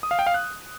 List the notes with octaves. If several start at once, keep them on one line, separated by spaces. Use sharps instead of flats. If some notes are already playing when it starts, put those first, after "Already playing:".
D#6
F5
G5
F5
F#6